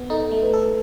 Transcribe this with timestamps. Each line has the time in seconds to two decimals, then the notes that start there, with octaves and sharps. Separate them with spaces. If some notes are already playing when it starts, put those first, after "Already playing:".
Already playing: B3
0.10 D#4 A4
0.31 A3
0.42 B4
0.53 A4